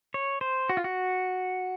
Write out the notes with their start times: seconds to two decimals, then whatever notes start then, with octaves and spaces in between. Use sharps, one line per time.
0.14 C#5
0.41 C5
0.69 F#4
0.77 F4
0.84 F#4